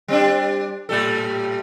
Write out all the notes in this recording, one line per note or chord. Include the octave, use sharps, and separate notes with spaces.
G3 C4 D4
A2 G3 A4